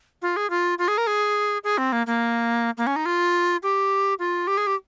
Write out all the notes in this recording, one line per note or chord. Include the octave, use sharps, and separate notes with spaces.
F4
G#4
F4
F4
G#4
A#4
G#4
G#4
C4
A#3
A#3
A#3
C#4
D#4
F4
G4
F4
G4
G#4
G4